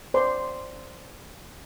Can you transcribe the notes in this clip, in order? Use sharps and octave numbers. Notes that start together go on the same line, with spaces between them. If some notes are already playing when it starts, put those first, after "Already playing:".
C5 D5 C6